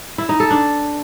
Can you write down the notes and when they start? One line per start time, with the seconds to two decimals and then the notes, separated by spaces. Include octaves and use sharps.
0.18 E4
0.29 D#4
0.40 A4
0.51 D4